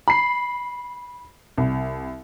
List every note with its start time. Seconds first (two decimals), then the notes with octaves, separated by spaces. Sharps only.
0.08 B5 C7
1.58 C2